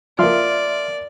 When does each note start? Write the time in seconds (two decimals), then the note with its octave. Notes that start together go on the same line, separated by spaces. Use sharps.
0.19 F3 A#3 D5 E5 C6 F6